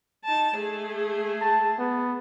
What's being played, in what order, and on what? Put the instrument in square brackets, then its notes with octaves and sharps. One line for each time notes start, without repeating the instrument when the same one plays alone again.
[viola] D#4 A5
A3 G#4
[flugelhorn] A5
B3